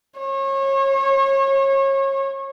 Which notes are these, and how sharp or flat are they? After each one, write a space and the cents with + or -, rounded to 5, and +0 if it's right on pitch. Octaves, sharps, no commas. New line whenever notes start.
C#5 -30